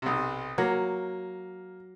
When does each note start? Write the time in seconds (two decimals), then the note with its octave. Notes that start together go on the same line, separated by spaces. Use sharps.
0.02 B1 C3
0.58 F#3 A#3